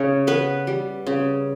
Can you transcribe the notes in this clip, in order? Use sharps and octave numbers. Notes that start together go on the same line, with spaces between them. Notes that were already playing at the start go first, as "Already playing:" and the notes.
Already playing: C#3 C#5
B3 B4
G3
C#3